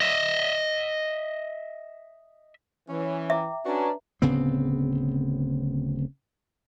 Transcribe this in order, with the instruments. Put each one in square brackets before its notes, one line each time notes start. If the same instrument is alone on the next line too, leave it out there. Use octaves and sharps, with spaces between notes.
[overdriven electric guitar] D#5 E5
[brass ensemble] E3 [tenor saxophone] C#4 [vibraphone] C#5
[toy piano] E5 [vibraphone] G5 A#5 D6
[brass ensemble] C#4 D4 [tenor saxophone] F#4 [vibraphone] B4 A#5
[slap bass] D1 C#3 B3 C4